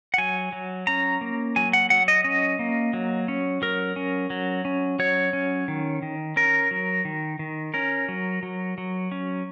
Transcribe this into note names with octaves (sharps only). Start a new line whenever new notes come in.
F#5
F#3 G#5
F#3
C#4 A#5
A#3
F#3 G#5
F#5
F#3 F#5
D#5
C#4 D#5
A#3
F#3
C#4
F#3 A#4
C#4
F#3
C#4
F#3 C#5
C#4
D#3
D#3
C#4 A#4
F#3
D#3
D#3
C#4 A#4
F#3
F#3
F#3
C#4